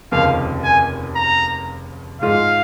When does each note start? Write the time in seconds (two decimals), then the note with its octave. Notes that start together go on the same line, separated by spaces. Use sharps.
0.12 F1 D#2 C#3 F3 F5
0.64 G#5
1.16 A#5
2.21 G#2 G#3 F4 F5